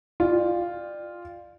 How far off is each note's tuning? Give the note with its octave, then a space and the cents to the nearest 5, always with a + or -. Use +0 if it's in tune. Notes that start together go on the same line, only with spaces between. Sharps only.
F4 +0 D5 +25 G5 +15